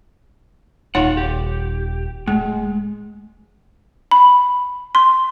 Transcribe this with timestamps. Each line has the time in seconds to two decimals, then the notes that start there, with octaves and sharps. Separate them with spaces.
0.95 D#1 D#4 F4 C#5 F#5 B5
1.17 G4
2.28 D1 G#3 A3
4.11 B5
4.95 C6